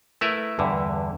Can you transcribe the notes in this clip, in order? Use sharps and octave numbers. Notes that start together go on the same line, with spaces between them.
A3 E4 A#4 B4 E5
E2 G2 D3